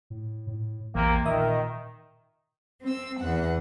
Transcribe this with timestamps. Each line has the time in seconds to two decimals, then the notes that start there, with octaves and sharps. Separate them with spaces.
0.10 A2
0.47 A2
0.95 A#1 E2 C3 A#3
1.26 A#2 D#3 E5 D#6
2.82 C4 E6
3.20 E2 F#5